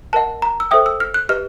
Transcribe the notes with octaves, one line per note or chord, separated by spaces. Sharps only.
A#4 D#5 F#5 A5
A#5
E6
A4 C5 E5 G5 D#6
E6
F6
F#6
G4 B4 D#5 F6